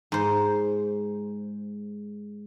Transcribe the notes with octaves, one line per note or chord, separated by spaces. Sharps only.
G#2 C5